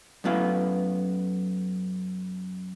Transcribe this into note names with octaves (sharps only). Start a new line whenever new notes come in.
F#2 A3 B3 E4 F5